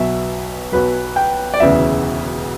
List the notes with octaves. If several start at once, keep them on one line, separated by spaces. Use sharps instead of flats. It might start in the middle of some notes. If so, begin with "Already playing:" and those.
Already playing: B1 B2 F#3 E5
B1 B2 F#3 B4
G5
D5
E1 D2 C#3 E3 E5